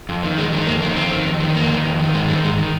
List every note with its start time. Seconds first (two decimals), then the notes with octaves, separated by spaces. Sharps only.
0.09 F2
0.23 D#3
0.38 F2 G#3
0.52 D#3 G#3
0.67 F2 A#3
0.82 D#3 A#3
0.96 F2 C4
1.12 D#3
1.26 F2
1.40 D#3
1.55 F2 A#3
1.70 D#3
1.86 F2
2.00 D#3
2.14 G#2 G#3
2.28 D#3 G3
2.44 G#2 G#3
2.58 D#3